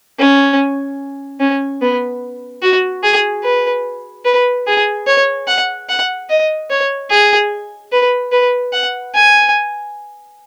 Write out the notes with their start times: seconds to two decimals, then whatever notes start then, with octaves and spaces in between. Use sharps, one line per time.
0.19 C#4
1.40 C#4
1.82 B3
2.62 F#4
3.03 G#4
3.44 B4
4.25 B4
4.67 G#4
5.07 C#5
5.47 F#5
5.89 F#5
6.30 D#5
6.70 C#5
7.10 G#4
7.92 B4
8.32 B4
8.72 F#5
9.14 G#5